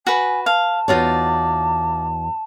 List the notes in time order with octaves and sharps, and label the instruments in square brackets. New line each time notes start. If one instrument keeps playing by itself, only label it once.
[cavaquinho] F#4 B4 [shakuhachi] G#5
[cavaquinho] F5 [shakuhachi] A5
[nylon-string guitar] E2 F#4 C#5 [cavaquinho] D#4 F4 D5